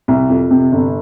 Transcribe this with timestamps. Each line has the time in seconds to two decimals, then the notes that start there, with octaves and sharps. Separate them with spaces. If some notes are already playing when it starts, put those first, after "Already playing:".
0.08 C2
0.29 F2
0.51 C3
0.72 G1